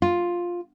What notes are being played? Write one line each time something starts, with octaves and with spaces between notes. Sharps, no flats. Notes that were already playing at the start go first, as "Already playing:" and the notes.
F4